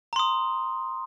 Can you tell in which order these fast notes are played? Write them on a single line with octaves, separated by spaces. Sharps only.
A#5 C6 D#6